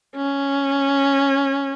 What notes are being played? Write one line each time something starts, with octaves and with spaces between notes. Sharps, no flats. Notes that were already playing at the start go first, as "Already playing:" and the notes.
C#4